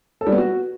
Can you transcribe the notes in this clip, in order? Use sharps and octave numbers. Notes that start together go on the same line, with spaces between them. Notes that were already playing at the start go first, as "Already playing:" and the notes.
A4
G3
B3
F#4